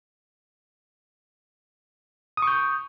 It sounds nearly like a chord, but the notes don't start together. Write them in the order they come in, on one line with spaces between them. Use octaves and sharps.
D#6 C#6 G6